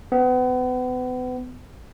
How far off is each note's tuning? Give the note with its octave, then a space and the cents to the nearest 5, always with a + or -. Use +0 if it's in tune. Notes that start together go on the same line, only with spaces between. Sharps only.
B3 +35